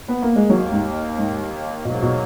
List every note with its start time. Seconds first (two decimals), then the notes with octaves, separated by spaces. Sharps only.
0.08 B3
0.22 A#3
0.36 G#3
0.50 D#2 D#3 F#3 A#3
0.72 G#2
1.18 G#2
1.85 G#2 B2 F#3 A#3
2.02 B2